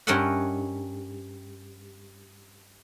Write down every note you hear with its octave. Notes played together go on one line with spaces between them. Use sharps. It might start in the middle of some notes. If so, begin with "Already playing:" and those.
G2 C#4 A#4 D#5 E5 F#5